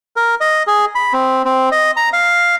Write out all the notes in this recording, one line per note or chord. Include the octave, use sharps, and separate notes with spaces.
A#4
D#5
G#4
B5
C4
C4
D#5
A#5
F5